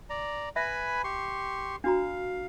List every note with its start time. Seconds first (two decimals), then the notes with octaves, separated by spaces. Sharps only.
0.10 D5 A#5
0.56 B4 E5 G#5 B5
1.04 G4 C6 C#6
1.84 D4 F#4 F5 A#5